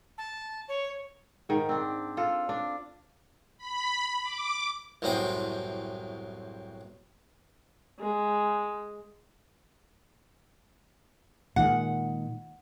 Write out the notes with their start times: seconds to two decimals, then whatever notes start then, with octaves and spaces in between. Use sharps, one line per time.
0.18 A5
0.68 C#5
1.49 G#2 D#3
1.69 C4 D4
2.17 F4 A4
2.49 D4
3.58 B5
4.23 D6
5.02 C2 F#2 A2 B3 C4 G5
7.99 G#3
11.56 A#2 D#3 G#3 F#5